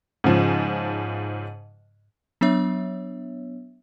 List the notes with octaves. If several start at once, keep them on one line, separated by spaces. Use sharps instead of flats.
G#2 C#3 F3
F#3 B3 D4 C#5 E5